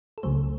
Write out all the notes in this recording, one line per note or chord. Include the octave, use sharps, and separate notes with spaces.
A4
C#2 C#3 F#3 A3 C5